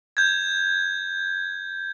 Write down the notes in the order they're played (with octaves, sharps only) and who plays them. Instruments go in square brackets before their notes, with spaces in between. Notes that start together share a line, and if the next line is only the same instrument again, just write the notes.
[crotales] G6 G#6